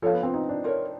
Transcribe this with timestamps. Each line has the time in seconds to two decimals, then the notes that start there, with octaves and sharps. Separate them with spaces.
0.02 F3 A4 C#5 F5 A5
0.13 B3
0.23 C4
0.34 D#4
0.49 D4
0.64 F4 A#4 C#5